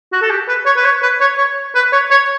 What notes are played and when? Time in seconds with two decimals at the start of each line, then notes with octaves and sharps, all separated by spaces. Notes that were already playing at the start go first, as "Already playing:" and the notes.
0.12 F#4
0.22 A4
0.30 G4
0.48 B4
0.66 C#5
0.77 B4
0.85 C#5
1.02 B4
1.21 C#5
1.38 C#5
1.75 B4
1.93 C#5
2.11 C#5